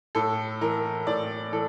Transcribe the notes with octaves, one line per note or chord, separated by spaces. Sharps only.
A2 A4
E3 A#4
A2 D5
E3 A4